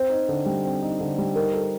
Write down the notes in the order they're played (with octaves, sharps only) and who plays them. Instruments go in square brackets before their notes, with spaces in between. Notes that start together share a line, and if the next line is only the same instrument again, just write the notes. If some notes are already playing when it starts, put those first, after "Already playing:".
Already playing: [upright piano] C4 [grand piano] C5
[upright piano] D#4
D3
G3
C4
D#4
D3
G3
[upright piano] D#4 [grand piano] A#4
[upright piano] A4